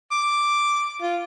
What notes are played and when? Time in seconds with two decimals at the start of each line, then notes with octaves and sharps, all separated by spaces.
0.11 D6
1.02 F4